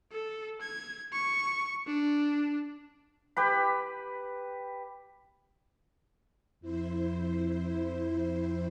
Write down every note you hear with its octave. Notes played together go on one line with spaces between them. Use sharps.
A4
G#6
C#6
D4
G4 B4 B5
F2 E4 C5